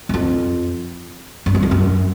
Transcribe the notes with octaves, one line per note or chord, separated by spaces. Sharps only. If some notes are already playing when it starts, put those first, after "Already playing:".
F#2
F2
G2
F#2
F2
F#2